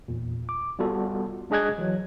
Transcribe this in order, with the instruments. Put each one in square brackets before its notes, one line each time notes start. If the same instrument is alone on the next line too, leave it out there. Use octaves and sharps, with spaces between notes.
[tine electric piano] E2 A#2
D6
G3 B3 F4 F#4 A4
G#3 D4 G#4 D#5 F#6 G#6
E3 F#3